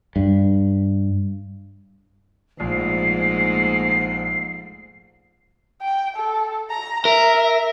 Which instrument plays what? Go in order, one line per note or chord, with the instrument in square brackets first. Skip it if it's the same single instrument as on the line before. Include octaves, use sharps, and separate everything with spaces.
[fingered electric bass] G2
[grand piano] A#1 [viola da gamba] G#2 A3 A#3 [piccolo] C7
[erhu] G5
A4
A#5
[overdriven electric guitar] A#4 [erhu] E5